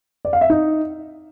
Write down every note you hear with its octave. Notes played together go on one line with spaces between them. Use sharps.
D5
F5
E5
D#4